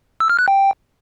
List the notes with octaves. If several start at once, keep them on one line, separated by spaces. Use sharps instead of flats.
E6
F6
F#6
G5